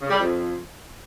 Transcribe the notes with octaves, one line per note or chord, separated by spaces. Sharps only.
C#3
G3
F2